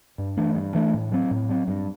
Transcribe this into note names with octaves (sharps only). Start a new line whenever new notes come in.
G2
E3 A3 D4
G2
E3 A3 D4
A2
F#3 C4
A2
F#3 C4
G2